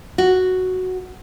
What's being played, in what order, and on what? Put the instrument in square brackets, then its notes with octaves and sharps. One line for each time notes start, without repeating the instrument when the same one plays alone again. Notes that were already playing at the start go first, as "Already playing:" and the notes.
[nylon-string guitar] F#4